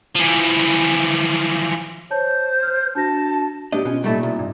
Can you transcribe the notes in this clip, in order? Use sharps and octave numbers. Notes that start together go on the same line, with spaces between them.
E3 F3
C5 C#5 A5 G6
F6 G6
D4 F#4 A5 A#6
F#3 B3 D4 G4 D#5
B2 C#4 F4 G#5
A#2 G3 A3 D#4 A4
C2
G2